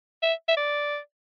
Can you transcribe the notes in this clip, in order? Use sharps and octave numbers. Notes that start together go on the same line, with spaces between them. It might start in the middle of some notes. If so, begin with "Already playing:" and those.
E5
E5
D5